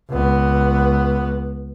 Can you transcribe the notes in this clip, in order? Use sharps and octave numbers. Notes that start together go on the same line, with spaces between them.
C#2 B3